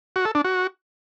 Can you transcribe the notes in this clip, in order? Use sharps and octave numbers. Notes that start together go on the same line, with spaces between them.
F#4
A4
D4
F#4